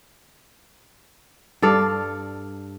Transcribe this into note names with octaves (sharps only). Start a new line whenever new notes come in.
G2 A4 D5 F5